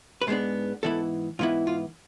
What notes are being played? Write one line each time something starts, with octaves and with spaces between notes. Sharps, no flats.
B4
G#2 G#3 B3 D4 C5
G#2 E3 B3 E4 A4
G#2 E3 B3 E4 F4
F4